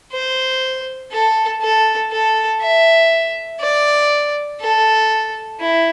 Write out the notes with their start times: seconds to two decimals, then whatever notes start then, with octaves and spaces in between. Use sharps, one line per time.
0.13 C5
1.12 A4
1.62 A4
2.12 A4
2.62 E5
3.61 D5
4.61 A4
5.60 E4